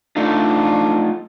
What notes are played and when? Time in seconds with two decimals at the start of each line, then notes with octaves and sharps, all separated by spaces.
0.17 A3 D4 D#4 F4